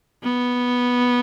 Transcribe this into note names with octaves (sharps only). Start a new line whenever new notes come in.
B3